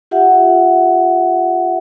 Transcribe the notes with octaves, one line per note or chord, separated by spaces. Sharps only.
F4 G4 E5 F#5